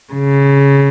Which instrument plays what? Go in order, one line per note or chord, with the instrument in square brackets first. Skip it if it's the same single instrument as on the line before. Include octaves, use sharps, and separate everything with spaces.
[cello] C#3